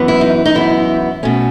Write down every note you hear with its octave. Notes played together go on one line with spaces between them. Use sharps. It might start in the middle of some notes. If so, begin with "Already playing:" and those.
Already playing: F#2 E3 B3
E4
D#4
D#4
F#2 E3 B3 E4
B2 A3 C#4